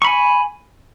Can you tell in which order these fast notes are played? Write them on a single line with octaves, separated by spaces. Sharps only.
C#6 B5 G#5